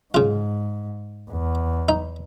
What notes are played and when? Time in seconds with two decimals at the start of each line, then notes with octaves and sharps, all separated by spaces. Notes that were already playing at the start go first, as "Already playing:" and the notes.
0.14 G#2 C#3 F4
1.31 E2
1.89 D#4